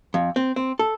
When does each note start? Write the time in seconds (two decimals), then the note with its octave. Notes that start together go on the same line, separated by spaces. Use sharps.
0.14 F2
0.36 C4
0.56 C4
0.79 A4